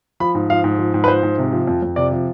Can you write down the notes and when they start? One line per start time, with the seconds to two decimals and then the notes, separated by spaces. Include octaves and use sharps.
0.20 F3 B5
0.35 G#2
0.50 F3 F5
0.64 G#2
0.79 F3
0.94 G#2
1.04 B4
1.08 F3 C5
1.23 G#2
1.38 C3
1.53 F3
1.67 F2
1.83 F2
1.96 C3 D5
2.12 F3